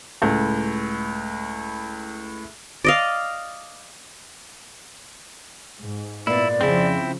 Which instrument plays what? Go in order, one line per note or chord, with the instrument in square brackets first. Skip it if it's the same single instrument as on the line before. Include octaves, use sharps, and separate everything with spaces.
[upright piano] C#2 A2
[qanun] D5 D#5 F5
[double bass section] G#2
[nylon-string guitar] A#2 B3 [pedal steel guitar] E4 [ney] D5
[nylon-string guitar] F2 G#4 [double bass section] C#3 F3 [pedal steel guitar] C4 E4